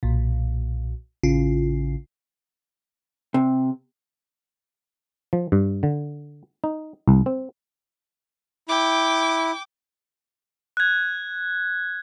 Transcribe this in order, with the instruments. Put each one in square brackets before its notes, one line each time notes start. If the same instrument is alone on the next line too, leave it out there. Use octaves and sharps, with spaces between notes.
[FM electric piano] B1 A#2
A1 C#3 F4
[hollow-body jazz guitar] C3
[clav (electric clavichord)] F3
G2
D3
D#4
C2
C4
[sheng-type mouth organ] E4 [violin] G5 D6
[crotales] F#6 G#6